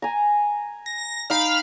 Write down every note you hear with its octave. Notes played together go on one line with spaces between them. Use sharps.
G#5 A#5
A#6
D#4 F5 G5 B5 F6